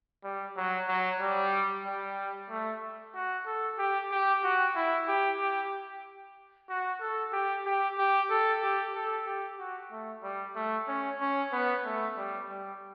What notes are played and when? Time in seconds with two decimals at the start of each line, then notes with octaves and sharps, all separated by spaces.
0.24 G3
0.56 F#3
0.88 F#3
1.20 G3
1.86 G3
2.50 A3
3.15 F#4
3.46 A4
3.79 G4
4.11 G4
4.44 F#4
4.75 E4
5.08 G4
5.40 G4
6.69 F#4
7.01 A4
7.33 G4
7.66 G4
7.99 G4
8.30 A4
8.63 G4
8.95 A4
9.26 G4
9.59 F#4
9.91 A3
10.23 G3
10.56 A3
10.88 C#4
11.21 C#4
11.52 B3
11.85 A3
12.17 G3
12.49 G3